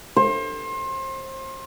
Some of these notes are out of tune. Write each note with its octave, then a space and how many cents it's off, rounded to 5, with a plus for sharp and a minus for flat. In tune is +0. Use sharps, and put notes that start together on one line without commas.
C5 +30